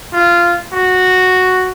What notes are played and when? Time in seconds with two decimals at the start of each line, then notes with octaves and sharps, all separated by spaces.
0.13 F4
0.73 F#4